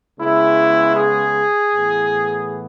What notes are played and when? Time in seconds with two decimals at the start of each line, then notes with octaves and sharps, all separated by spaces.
0.19 C#3 G#3 B3 E4
0.96 G#4
1.73 A2 E3 B3